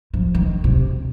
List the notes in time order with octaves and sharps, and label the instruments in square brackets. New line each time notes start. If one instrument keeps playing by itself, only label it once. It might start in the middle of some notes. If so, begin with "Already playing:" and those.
[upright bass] F3
D#3
C3